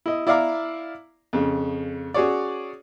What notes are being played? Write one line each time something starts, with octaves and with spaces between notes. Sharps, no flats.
E4 D#5
E4 D5 E5 F5 A#5 D6
F2 C#3
C#4 F#4 G#4 C#5 D5